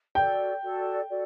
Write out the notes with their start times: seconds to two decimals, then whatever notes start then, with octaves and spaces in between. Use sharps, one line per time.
0.15 F#4 A4 D5 G5
0.62 F#4 A4 D5
1.09 F#4 A4 D5